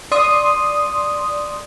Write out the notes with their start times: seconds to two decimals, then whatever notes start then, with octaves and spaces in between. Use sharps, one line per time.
0.12 D5 C6 D#6